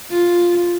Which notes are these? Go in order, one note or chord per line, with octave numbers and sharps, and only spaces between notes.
F4